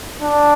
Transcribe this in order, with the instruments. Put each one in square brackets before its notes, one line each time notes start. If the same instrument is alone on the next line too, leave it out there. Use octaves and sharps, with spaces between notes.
[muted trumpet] D4